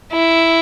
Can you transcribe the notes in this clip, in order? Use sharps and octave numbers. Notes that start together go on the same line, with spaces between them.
E4